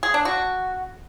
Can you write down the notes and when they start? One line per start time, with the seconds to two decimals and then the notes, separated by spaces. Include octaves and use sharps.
0.03 G#4
0.14 D4
0.25 F#4